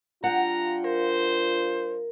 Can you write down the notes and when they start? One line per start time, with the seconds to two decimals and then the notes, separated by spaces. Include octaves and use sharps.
0.24 G3 D4 F4 F#5 G5 A#5
0.84 A#4 C5